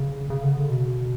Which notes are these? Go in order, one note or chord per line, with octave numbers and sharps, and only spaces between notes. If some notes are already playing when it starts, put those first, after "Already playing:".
Already playing: C#3
C#3
D3
C#3
B2